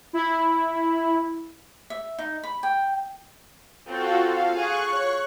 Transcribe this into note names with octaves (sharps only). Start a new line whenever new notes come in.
E4
E5
D#4
B5
G5
C4 F4 F#4 A4
F5
G#4 C#6 F#6
C#5